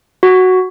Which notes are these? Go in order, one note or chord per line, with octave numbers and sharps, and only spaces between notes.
F#4